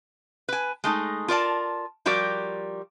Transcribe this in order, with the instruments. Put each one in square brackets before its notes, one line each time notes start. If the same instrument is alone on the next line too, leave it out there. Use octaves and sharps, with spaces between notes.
[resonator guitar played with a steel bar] B4 G#5
G#3 A3 D#4
F4 A#4 D5 A5
F3 G3 F#4 G4 A#4 D5